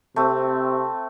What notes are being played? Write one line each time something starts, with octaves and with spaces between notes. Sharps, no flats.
C3 A3 C4